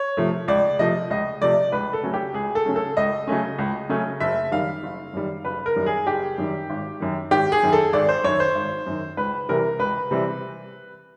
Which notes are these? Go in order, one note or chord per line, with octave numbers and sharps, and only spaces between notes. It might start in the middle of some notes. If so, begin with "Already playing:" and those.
Already playing: C#5
C3 F3 A3
C#2 D5
C3 F3 A3 D#5
C#2 D#5
C3 F3 A3 D5
C#2 B4
A4
C#3 F#3 A3 C#4
G4
C#2 G#4
A4
C#3 F#3 A3 C#4
A4
C#2 D#5
C#3 F#3 A3 C#4
C#2
C#3 F#3 A3 C#4
F#1 E5
F#2 D#3 G3 F5
F#1
F#2 D#3 G3
F#1 B4
A#4
F#2 D#3 G3
G#4
F#1 G4
F#2 D#3 G3
G#1
F#2 D#3
G#1 G4
G#4
F#2 D#3
A4
G#1 D5
C5
F#2 D#3 C#5
C5
G#1
F#2 D#3
C#2 B4
C3 E3 G3 C4 A#4
C#2 B4
C3 E3 G3 C4